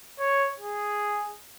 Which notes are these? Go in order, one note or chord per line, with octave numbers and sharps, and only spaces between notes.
C#5
G#4